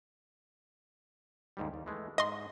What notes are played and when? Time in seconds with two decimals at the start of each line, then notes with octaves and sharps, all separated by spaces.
1.57 D#2 G#2 G3
1.74 D#2
1.86 E3 G#3 A3
2.18 G#2 D#5 C6